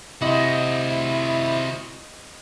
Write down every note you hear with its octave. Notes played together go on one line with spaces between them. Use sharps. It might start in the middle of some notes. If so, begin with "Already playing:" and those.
C3 E4 F#4 C5 D#5